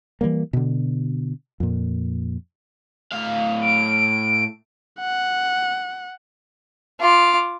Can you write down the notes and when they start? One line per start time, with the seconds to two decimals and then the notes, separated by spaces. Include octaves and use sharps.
0.21 E3 F#3 G3 A#3
0.53 B2 D3
1.60 F2 A#2
3.12 A2 F5
3.61 D7
5.00 F#5
7.00 F4 D6